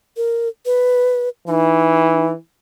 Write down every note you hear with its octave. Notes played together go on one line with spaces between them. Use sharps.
A#4
B4
E3 D#4